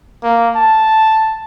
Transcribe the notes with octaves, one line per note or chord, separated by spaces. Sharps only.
A#3
A5